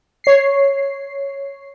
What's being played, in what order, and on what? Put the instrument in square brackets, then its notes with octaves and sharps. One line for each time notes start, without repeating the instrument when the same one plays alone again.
[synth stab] C#5 C7